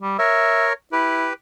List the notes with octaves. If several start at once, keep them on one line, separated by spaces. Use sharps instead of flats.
G3
A#4 C#5 E5
E4 G4 B4